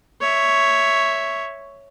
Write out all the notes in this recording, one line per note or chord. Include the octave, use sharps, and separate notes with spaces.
C#5 E5